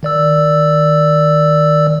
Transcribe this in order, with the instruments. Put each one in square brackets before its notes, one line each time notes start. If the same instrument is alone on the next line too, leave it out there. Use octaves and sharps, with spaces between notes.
[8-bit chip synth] D#3 D5 E6